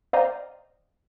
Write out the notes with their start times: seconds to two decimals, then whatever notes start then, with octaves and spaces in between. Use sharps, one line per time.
0.13 C5 D5 D#5 F5 G5 A#5